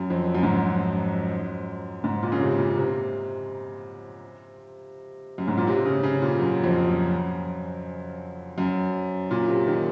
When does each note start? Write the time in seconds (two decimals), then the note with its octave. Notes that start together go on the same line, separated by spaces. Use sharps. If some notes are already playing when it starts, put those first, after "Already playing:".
Already playing: F#2
0.10 F2
0.35 F#2
0.43 G#2
0.51 F#2
2.04 G#2
2.22 A#2
2.32 C#3
2.41 C3
2.58 A#2
2.76 C3
5.38 F#2
5.48 G#2
5.57 A#2
5.67 C3
5.85 C#3
6.03 C#3
6.22 A#2
6.40 F#2
6.64 F2
6.88 F#2
8.58 F#2
9.31 A#2
9.48 C3
9.67 D#3